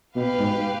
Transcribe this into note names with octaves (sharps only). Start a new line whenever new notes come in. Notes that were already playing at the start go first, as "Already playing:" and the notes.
B2 G4 B4 F5
G#2